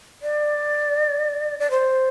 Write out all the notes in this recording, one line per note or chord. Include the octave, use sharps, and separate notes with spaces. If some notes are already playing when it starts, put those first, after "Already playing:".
D5
D5
C5